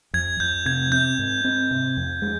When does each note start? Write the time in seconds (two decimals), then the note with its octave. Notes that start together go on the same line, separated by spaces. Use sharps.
0.14 F2 G#6
0.40 F2 G6
0.66 C3 G#6
0.92 C4 G6
1.19 G#2
1.45 C4
1.71 C3
1.97 F2
2.22 G#3